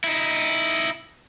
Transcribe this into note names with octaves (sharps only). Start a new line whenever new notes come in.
D#4 E4